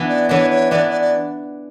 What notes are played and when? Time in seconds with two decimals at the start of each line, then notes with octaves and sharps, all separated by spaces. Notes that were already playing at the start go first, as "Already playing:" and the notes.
Already playing: E3 B3 D4
0.08 D5
0.29 E3 B3 D4 C#5
0.50 C#5
0.71 E3 B3 D4 D5
0.91 D5
1.01 D5